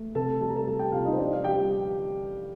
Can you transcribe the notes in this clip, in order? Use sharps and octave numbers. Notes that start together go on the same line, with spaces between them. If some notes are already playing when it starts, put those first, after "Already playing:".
Already playing: A3
C3 A4 A5
G3 A5
A#5
A4 A5
G3 A4 A5
G4 G5
C3 F4 F5
D#4 D#5
C5
G3 D4 D5
F5
G3 G4 G5